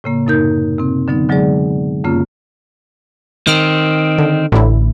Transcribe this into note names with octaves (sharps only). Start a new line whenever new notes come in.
A2 C#3 A#3
F#2 C3 D#4 A#4 G6
C3 C4
D3 F#3 B3 D#4
D3 F#3 G#3 G#4 D5
F#2 C#3 A#3 C#4 F4
D#3 C4 F6
D3
A1 A2 D3 E4